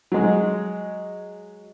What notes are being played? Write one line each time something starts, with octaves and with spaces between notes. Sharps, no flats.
F#3 G#3